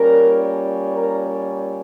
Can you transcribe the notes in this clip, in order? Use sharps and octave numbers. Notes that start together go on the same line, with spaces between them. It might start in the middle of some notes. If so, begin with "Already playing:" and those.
Already playing: A#2 G3 C#4 A#4
A#4